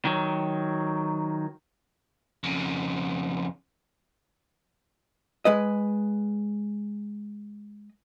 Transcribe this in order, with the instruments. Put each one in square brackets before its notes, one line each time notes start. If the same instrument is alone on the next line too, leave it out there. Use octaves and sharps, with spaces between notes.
[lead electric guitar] D#3 F#3
F2 C#3
[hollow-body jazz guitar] G#3 B4 D#5